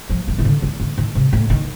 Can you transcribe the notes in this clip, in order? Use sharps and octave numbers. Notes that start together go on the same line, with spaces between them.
F3
D#3
D#3
D3
D#3
D3
D#3
C3
A2
D#3